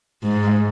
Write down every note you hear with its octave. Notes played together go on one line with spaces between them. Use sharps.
G#2